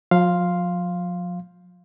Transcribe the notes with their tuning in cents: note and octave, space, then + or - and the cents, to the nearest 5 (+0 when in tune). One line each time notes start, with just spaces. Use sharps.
F3 +40 F5 +0 C6 +0